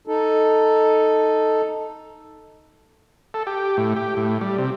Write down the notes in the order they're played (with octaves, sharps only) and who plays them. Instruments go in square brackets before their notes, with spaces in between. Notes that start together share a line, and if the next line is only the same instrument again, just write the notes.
[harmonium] D#4 A4
[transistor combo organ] A4
G4
A2
G4
A2
G3
C3